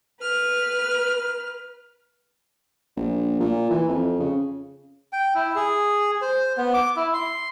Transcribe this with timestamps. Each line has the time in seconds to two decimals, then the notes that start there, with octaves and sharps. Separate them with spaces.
0.21 B4 F6
2.97 A#1
3.40 A#2
3.70 E3
3.89 F2
4.20 C#3
5.13 G5
5.35 E4
5.55 G#4
6.22 C5
6.57 B3
6.74 D6
6.96 E4
7.14 C6